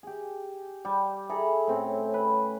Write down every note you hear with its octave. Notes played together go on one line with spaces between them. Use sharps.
G4 G#4
G3 D5
E4 G#4 A4 A#5
A2 C4 C#4
B4